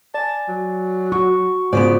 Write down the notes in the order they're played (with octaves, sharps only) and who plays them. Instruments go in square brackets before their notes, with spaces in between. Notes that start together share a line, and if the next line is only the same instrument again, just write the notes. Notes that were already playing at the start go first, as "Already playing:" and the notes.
[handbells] D5 G#5 [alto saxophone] A5
[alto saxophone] F#3
[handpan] F#4 [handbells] C#6
[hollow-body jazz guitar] G#2 C#3 B3 [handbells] F4 C5 [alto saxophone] D5